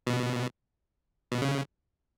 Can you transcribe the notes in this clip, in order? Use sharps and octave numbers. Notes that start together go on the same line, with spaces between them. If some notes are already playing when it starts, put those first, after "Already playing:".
B2
B2
C#3